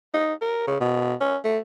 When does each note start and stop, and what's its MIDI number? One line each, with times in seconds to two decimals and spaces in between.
0.14 0.33 63
0.41 0.65 70
0.67 0.79 49
0.80 1.14 47
1.20 1.37 61
1.44 1.58 57